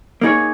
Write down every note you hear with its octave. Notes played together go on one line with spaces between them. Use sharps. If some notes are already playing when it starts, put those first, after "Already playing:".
A#3 D#4 G#4 C#5